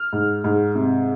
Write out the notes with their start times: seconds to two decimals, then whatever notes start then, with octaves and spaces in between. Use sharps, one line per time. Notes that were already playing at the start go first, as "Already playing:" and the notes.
Already playing: F6
0.13 G#2
0.44 G#2
0.75 C3